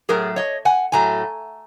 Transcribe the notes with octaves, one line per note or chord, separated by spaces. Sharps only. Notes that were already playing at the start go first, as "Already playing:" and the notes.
A2 F#3 A3 G#4 A#4
C#5 D#5
F#5 G#5
A2 F#3 A3 G#5 A#5